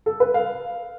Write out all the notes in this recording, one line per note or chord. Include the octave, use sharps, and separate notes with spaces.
A4
B4
F5